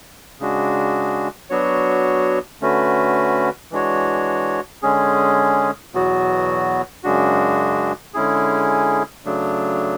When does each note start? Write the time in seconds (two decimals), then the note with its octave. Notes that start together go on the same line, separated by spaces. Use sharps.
0.40 C#3 G#3 D4 F#4
1.50 F#3 B3 D4 F#4 C#5
2.61 D3 A3 C#4 F#4 B4
3.71 E3 G#3 D4 F#4 C#5
4.82 D3 G#3 C#4 G#4
5.93 E2 B2 F#3 B3 F#4
7.03 F#2 C#3 G#3 D4 F#4
8.14 D3 G#3 C#4 E4 G#4
9.25 C#3 F#3 A3 D4